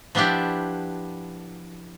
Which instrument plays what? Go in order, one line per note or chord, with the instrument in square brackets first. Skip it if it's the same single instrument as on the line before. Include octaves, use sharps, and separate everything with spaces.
[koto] F3 B3 D4 E4 G4